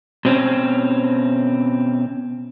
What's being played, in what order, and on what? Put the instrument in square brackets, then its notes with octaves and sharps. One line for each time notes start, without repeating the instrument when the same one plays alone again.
[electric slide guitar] B2 C4 C#4